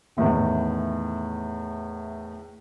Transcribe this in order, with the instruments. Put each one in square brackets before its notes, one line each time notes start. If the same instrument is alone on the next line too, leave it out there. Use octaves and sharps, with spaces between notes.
[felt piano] E2 A2 D#3